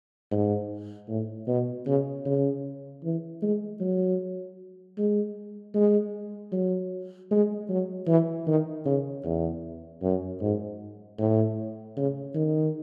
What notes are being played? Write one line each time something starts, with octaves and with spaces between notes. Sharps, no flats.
G#2
A2
B2
C#3
C#3
E3
G#3
F#3
G#3
G#3
F#3
G#3
F#3
E3
D#3
C#3
E2
F#2
G#2
A2
C#3
D#3